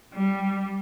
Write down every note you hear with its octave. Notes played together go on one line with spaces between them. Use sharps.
G3